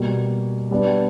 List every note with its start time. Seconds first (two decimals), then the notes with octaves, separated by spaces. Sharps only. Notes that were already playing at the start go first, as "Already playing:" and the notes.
Already playing: B2 G3 A#3
0.71 G3 B3 D4